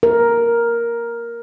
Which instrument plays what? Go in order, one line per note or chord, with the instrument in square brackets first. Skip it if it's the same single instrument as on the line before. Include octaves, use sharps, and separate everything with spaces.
[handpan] A#4